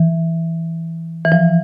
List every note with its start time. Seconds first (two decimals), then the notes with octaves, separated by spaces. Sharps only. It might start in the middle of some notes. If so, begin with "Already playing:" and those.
Already playing: E3
1.25 E3
1.32 F3